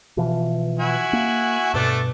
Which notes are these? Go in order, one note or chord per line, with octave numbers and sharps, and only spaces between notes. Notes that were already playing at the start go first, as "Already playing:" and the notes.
B2 E3 F3
E4 F#4 G#5
A#3
G2 B2 A3 D4 A4